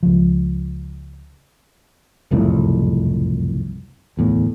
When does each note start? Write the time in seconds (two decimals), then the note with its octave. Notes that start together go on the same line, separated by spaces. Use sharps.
0.03 C#2 F3
2.31 F#1 C2 F2 A2
4.17 D1 E2 A2